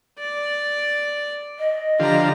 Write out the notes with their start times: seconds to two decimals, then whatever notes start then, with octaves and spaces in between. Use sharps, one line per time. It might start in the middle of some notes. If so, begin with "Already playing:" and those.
0.19 D5
1.59 D#5
2.00 D3 F3 G4 A#5